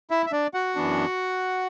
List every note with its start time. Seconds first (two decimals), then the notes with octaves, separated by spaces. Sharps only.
0.10 E4 E5
0.26 E5
0.32 D4 D5
0.54 F#4 F#5
0.75 F#2 E3 B3 D4